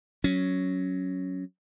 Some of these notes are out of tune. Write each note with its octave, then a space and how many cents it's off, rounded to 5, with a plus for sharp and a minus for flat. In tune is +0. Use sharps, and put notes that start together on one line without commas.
F#3 +0 C#4 +0